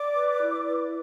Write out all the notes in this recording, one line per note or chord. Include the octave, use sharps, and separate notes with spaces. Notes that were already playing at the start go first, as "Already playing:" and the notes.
Already playing: D5 D6
B4
E4
B4